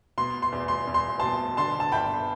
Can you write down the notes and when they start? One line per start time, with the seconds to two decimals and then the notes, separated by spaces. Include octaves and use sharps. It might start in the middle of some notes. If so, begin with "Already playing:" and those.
0.18 B2 C6
0.42 C6
0.52 E2
0.68 C6
0.87 E2
0.94 C6
1.20 B2 A5 C6
1.57 D3 A5 C6
1.80 A5
1.92 G1 G5 B5